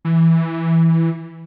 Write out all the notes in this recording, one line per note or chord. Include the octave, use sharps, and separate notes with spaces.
E3